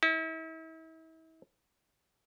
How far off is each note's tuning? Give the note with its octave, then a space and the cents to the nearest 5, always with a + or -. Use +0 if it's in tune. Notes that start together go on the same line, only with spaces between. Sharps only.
E4 -40